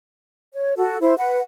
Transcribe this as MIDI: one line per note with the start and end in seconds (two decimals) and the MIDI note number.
0.54 0.76 73
0.76 0.97 66
0.76 0.97 69
1.01 1.15 64
1.01 1.15 72
1.18 1.40 71
1.18 1.40 78